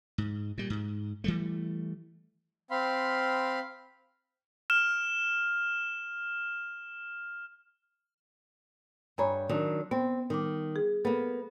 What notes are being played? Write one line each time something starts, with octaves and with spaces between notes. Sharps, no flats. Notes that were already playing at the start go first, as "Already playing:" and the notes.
G#2
A#2 G3
G#2
E3 G3 A3
C4 F5 B5 C6
F6 E7
G2 C#5 G#5 A#5 B5
D#3 F#3 D4 A#4
B3 C4
D#3 G3 D6
G#4
A#3 B3 A4